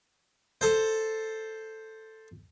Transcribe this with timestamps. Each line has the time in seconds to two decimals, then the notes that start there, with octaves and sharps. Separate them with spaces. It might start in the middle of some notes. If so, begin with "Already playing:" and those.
0.61 A4 C5